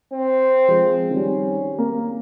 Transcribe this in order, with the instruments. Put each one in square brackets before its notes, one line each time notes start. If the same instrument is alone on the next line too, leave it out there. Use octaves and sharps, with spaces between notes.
[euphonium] C4
[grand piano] F3 G#3
[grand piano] D#3 G3 [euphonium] C#4
[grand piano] A#3